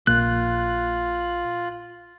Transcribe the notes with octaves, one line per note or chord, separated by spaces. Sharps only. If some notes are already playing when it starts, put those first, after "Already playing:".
A#1 A#3 F4 F#6